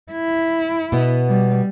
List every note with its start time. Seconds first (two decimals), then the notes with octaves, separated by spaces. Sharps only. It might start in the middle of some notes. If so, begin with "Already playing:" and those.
0.12 E4
0.92 B2 B3
1.29 G3